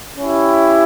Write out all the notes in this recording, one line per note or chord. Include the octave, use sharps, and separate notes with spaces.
C#4 E4 G4